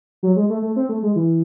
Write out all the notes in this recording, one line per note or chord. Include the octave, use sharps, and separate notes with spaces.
F#3
G#3
A3
A3
C4
A3
G#3
E3